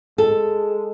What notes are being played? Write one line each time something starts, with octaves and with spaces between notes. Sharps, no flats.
G#3 A4